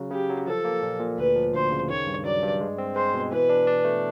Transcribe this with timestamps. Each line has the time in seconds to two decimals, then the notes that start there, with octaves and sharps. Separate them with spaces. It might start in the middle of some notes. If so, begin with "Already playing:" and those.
Already playing: C#3 F#3
0.11 C#3 G4
0.29 F#3
0.47 F3 A4
0.65 A#3
0.83 A#2
1.00 A#2
1.18 D2 B4
1.36 F3
1.54 D2 C5
1.72 C#3
1.89 D#3 C#5
2.07 G2
2.25 F#3 D5
2.43 G2
2.61 G#3
2.78 C4
2.95 G#3 C5
3.14 B2
3.31 E3 B4
3.49 D4
3.67 D4
3.85 A3